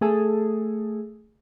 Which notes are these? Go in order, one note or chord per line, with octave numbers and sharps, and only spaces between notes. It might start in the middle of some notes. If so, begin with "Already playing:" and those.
A3 G#4 A4